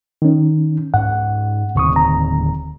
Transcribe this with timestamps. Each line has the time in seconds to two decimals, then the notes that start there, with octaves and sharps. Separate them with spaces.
0.22 D#3 C#4
0.94 G#2 C#4 F#5
1.75 D1 D#2 C3 C4 C#6 D#6
1.96 A#5